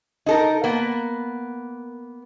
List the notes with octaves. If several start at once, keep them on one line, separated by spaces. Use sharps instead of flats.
D#4 A4 A#4
A#3 B3